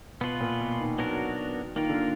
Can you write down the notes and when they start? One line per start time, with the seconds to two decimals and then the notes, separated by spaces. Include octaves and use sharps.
0.20 B2 B3 F4 B4
0.41 A#2
0.60 B2
0.80 D#3
0.99 F#3 B3 D4 F#4 A#4
1.76 D#3 A#3 F4 A#4
1.89 D3